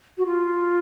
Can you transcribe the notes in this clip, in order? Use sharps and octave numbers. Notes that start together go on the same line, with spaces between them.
F#4
F4